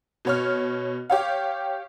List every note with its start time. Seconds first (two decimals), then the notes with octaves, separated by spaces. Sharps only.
0.25 B2 C#5 F6
1.10 G4 C#5 F5